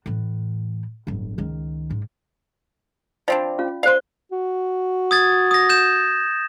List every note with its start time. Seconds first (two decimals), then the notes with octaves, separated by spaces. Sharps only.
0.06 A2 E3
1.07 D1 G1
1.38 C#2 D#3
1.90 G#2
3.28 F3 C4 D4 D5 B5
3.59 C#4 F4 F5
3.83 C5 D5 F5 C6
4.32 F#4
5.11 D#6 G#6 A6
5.51 D#6 A#6
5.69 G6 E7